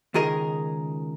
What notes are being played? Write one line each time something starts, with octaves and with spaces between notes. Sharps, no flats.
C#2 D#3 G#4 A#4 D#5